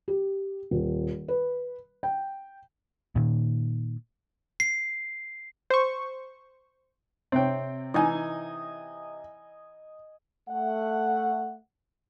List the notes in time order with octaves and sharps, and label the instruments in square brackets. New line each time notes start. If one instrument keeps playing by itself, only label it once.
[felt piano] G4
D#1
B4
G5
[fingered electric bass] A#2 D#3
[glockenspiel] C7
[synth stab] C5 C#6
[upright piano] C3 C#5 [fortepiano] C4 G5
[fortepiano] E3 D#4 [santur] D#5 G#5
[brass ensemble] A3 F#5